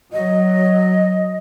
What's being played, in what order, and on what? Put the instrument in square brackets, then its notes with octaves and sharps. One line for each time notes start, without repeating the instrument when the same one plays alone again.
[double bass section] F#3 [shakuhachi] D#5